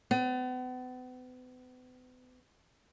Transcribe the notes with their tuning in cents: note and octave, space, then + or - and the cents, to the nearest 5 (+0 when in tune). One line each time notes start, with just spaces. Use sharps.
B3 +40